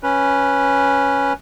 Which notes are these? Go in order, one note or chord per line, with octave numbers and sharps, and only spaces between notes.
C#4 B4